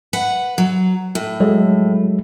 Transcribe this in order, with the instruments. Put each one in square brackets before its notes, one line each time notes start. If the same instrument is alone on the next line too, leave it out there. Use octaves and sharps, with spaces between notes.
[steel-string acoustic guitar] B4 F#5
F#3
A2
[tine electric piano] F#3 G#3 A4